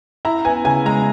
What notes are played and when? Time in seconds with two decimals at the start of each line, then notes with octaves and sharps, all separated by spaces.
0.25 E4 A#5
0.45 B3 G#5
0.65 C#3 G#5
0.85 G#3 A#5